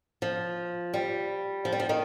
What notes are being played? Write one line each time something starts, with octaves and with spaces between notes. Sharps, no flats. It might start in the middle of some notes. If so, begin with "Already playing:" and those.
F3
G3
F3
G3
F3
D#3